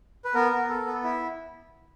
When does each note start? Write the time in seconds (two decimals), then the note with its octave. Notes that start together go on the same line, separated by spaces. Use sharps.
0.25 B4
0.34 B3 A#4
0.52 B3
0.69 A4
0.86 B3
1.03 E4